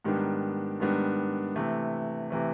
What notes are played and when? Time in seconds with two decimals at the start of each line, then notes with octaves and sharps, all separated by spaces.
0.04 G#2 D#3 G3 B3 D4
0.80 G#2 D#3 G3 B3 D4
1.56 C3 E3 A3
2.30 C3 E3 A3